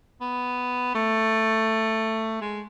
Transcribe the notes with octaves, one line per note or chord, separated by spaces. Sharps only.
B3
A3
G#3